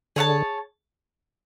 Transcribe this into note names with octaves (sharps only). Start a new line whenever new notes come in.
D3 G#4 C#5 F#5 A5